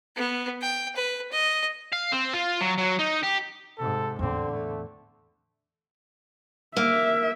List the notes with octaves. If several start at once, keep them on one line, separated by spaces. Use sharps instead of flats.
B3
G5
B4
D#5
F5
C4
F4
F#3
F#3
D#4
G4
G#2 C3 A4
E2 A2 D3 C4
A3
A#3 E5